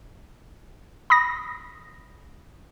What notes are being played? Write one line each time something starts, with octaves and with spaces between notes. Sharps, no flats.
B5 D#6 A#6